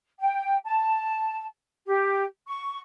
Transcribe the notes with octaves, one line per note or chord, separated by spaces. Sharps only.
G5
A5
G4
C#6